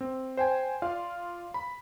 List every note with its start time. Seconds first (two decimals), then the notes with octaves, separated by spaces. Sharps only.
0.01 C4
0.37 C5 G5 G#5
0.82 F4 D5 F5
1.54 B5